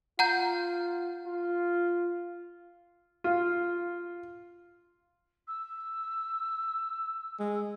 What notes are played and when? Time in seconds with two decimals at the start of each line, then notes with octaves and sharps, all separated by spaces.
0.19 F4 F#5 A#5 G6
1.27 F4
3.24 F4
5.47 E6
7.40 G#3